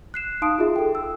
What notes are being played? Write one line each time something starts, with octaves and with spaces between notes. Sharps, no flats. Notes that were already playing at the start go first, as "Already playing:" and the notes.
F#6 C7 E7
D#4 F5 A5 C6 D#6 D7
F4 F#4 G#4 E5
A4 G5
E6